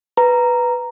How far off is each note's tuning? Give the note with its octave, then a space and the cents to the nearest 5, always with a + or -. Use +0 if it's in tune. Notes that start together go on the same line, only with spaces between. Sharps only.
B4 +0 A#5 +0